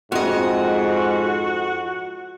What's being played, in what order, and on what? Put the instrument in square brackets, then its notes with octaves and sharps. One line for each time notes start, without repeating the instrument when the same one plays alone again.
[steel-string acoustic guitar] F2 D#5 [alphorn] G#2 [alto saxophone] F#4